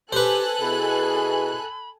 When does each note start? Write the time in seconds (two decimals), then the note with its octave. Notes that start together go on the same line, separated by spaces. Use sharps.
0.12 G4 A4 B4 C5 G#5 F#6
0.61 B2 E4 G#4 B5